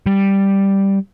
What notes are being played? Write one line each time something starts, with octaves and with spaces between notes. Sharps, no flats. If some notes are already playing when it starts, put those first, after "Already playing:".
G3